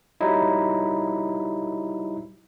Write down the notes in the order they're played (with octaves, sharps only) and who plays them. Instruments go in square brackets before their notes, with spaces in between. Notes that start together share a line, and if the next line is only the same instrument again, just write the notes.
[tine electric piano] F#3 G3 D#4 E4